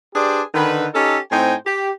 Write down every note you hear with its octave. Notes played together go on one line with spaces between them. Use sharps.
D4 G4 G#4 B4 C5 D5
D3 D#3 B4
C#4 D#4 G4 A4
A2 C4 D#4 C5 G5 G#5
G4